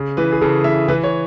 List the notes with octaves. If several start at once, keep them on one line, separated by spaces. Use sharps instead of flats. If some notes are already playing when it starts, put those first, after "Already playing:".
Already playing: C#3
E3 B4
G#4
C#3 A4
E3 E5
E3 B4
C#5